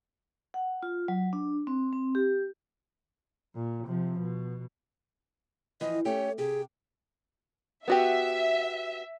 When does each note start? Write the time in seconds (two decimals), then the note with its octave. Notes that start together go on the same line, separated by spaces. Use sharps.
0.54 F#5
0.83 F4
1.08 F#3
1.33 D4
1.67 C4
1.93 C4
2.15 G4
3.55 A#2
3.87 C3 F3
4.20 B2
5.81 A2 E3 F3 D#5
6.05 A3 C#4 G4 C#5
6.38 C3 G4 G#4
7.88 B3 F#4 G4 E5